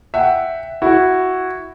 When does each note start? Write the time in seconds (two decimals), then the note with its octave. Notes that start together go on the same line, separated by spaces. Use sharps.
0.14 E5 F#5 G5
0.82 E4 F#4